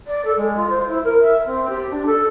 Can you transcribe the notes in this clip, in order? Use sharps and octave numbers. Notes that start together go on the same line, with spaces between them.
D5
A4
G#3
F4
C5
E4
A#4
E5
C4
G4
D4
A4